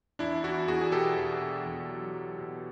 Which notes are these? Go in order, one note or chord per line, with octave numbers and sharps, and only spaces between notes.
E2 D4 E4
E2 E4 F#4
E2 F#4 G#4
G#4
B2 G4 A4
E2
B2
E2
F#3
F#3
B2